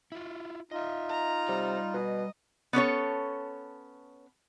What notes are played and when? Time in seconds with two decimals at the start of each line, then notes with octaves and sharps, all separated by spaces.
0.12 E4 F4
0.72 D#4 F4 D#5 E5
1.09 A#5
1.48 C3 G3 D5
1.94 B2 D#5
2.73 B3 C#4 A4 C#5